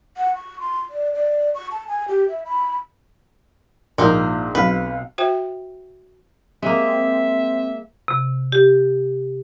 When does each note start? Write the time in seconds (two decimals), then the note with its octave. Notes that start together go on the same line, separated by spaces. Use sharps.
0.17 F#5
0.36 C#6
0.60 C6
0.90 D5
1.14 D5
1.55 C#6
1.71 A5
1.88 G#5
2.08 G4
2.28 E5
2.45 B5
3.98 A#1 G#2 A#3 D#4 C5
4.55 B1 C4 B4 F5
5.18 F#4 C5 E5 G5
6.63 G#3 A#3 C4 E5
8.08 C3
8.52 G4